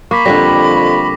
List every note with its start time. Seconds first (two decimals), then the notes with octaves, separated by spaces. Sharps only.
0.11 A#3 B5 C#6 D6 B6
0.25 F2 D3 G3 A#6